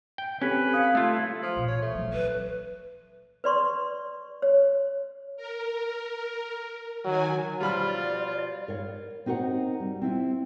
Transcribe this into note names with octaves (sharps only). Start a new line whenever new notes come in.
G5
C4 C#4 G4 A4 B4
F5 D#6 G#6 C#7
A3 E4 F4
F3
A#2 E3
C#5
A3
F3 F#3
E3 C4 B4
B4 D5 C6 C#6
C#5
A#4
D#3 F#3 G#5
B2 F3 G3 F4 D5 B5 F6
A#4 C#5 F5
C4 D#4 F#4 A#4 F#5
G3
C4 E4 F4